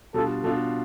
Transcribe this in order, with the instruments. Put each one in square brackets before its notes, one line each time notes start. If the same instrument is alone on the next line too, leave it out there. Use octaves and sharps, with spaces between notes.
[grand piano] B2 G3 D4 F4 [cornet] A4
[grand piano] B2 G3 D4 F4 [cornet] A4